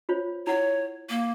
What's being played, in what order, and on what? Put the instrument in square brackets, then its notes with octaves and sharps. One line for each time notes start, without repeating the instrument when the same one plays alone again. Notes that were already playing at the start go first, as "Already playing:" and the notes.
[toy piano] F4 C5 C#5
[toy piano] E4 F#5 [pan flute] C#5
[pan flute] A#3